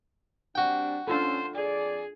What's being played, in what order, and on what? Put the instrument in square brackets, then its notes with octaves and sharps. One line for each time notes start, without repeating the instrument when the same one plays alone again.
[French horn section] G3 C4 D4 [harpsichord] F#4 G5
[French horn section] C#4 [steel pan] D4 F4 A4 [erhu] C5
[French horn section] F2 D5 [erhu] G#4